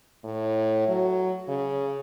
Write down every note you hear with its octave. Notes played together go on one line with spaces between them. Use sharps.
A2
F#3
C#3